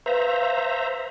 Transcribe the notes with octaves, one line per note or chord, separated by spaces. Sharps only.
B4 C5 E5 F5 A#5